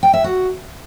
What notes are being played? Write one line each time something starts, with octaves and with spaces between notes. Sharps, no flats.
G5
E5
F#4